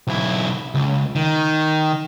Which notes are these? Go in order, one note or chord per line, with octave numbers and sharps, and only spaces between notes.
B1 E4
C#2
D#3